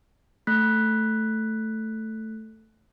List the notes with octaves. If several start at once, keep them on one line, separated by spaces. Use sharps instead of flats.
A3 F#6 B6